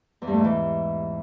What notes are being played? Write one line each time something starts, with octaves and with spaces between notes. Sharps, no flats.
E2
G2
A3
G#2
E3